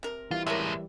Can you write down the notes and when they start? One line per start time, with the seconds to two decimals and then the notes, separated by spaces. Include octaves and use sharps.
0.03 C3 A#4
0.31 E3 G3 E4 F4
0.47 A2 G#3 A#4 C#5 E5